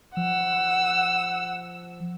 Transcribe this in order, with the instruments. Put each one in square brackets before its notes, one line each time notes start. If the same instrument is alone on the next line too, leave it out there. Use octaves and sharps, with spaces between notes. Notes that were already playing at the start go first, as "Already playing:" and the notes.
[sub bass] F3 [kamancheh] F#5 E6